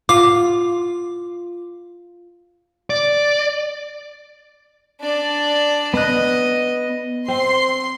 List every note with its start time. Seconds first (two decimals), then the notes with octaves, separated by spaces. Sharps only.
0.09 F4 D6
2.90 D5
5.01 D4 D5
5.94 B3 D#5 F#6
7.28 C4 C6